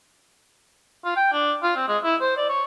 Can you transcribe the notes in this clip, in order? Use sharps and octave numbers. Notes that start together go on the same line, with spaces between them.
F4
G5
D4
F4
C4
G#3
E4
C5
D5
C#5